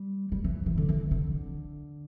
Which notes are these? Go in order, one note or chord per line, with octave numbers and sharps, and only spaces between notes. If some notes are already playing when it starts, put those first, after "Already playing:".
Already playing: G3
G3
E3
E3
D3
E3
D3